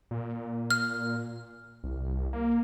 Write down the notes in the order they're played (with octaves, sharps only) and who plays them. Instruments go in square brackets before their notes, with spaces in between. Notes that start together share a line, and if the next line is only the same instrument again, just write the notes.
[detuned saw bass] A#2
[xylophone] F6
[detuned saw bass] C2
A#3